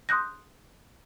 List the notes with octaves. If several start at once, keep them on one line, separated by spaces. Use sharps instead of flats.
C6 D#6 F#6 G6 A#6